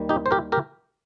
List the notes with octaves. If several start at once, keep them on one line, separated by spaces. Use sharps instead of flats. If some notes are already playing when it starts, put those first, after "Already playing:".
Already playing: D#2 D#3 G3
D#4 G4
C5
G4 A#4
G4 A#4